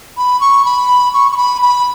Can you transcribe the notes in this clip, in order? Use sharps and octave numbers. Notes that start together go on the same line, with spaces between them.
B5
C#6
B5
C#6
C#6
B5
B5